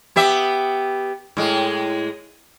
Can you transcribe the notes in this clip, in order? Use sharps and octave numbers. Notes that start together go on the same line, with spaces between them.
B3 G4 E5
A2 G#3